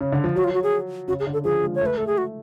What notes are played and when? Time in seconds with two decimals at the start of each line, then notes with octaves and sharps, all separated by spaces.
0.01 C#3
0.12 D3
0.24 F3
0.36 F#3 F#4
0.44 F4
0.54 F#4
0.63 G#4
1.08 C#3 F#4
1.20 G#4
1.27 D3
1.33 A4
1.44 F3 G#4
1.63 G#3
1.75 C#5
1.81 A3
1.86 B4
1.97 A3 A4
2.07 G#4
2.18 F#4